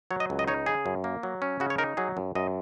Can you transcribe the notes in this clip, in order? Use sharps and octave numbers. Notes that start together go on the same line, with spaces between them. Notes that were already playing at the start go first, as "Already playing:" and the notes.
F#3 C#5
D#5
C#2
D#5
D#4 C#5
C#3 G#4
F#2
A#3
F#3
C#4
C#3 F#4
C#5
D#4 A#4
F#3 G#4
F#2
F#2 D#5